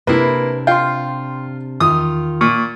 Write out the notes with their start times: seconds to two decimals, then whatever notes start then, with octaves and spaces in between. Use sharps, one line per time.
0.07 C3 A#3 D4 E4 B4
0.67 F4 G5 C6
1.80 E2 D#3 F4 D#6
2.41 A#2 C#6